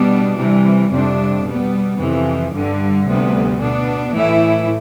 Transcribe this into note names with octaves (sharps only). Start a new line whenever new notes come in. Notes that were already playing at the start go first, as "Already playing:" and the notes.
Already playing: B2 G3 B3 D4
C3 E3 G3
F2 C3 G3 D4
B2 G3 B3
F2 C3 E3
G2 D3 G3
D2 C3 G3 B3
B2 B3 D4
A2 E3 A3 E4